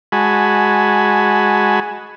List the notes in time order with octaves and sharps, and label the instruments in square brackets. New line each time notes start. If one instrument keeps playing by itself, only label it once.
[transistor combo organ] G#3 F#4 G#5 A5 B5